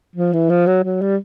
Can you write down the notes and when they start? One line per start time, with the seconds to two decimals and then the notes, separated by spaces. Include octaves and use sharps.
0.16 F3
0.33 E3
0.50 F3
0.67 F#3
0.84 F#3
1.02 G3